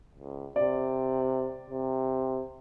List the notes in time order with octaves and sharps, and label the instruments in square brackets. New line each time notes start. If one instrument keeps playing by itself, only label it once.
[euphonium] C#2
[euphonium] C3 [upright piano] D5
[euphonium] C3